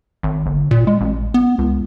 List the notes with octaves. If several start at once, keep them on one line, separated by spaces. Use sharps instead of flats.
G#1
G1
A#2
G#3
A1
B3
C#2